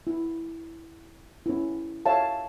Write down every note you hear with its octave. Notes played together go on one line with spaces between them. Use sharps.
E4
C#4 E4
C#5 E5 F5 A5